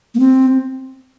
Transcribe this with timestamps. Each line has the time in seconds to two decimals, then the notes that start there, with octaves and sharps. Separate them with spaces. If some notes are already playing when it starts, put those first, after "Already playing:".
0.15 A#3
0.20 C4